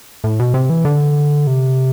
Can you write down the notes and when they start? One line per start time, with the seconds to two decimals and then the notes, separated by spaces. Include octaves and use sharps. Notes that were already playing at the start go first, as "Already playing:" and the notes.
0.24 A2
0.39 B2
0.54 C3
0.70 E3
0.85 D3
1.47 C3